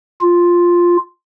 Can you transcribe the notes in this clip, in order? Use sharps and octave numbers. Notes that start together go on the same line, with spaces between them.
F4